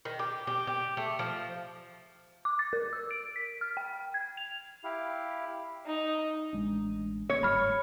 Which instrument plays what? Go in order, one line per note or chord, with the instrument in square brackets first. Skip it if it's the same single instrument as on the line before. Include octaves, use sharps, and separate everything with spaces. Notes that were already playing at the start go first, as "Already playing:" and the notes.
[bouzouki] D#3
G4
G4
G4
A3
F3
[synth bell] D6
A6
A#4
E6
D7
B6
F6
G5
G#6
F7
[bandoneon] E4 G4 F5
[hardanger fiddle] D#4
[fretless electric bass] A1 G#3 D4
[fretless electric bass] A#3 [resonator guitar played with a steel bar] C#5
[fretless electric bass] G1 G#2 G3 [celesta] B5 F6